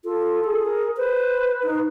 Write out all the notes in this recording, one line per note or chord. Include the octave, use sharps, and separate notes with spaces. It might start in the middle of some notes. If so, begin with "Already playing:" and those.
F4 A4
G#4
A#4
B4 C5
D#4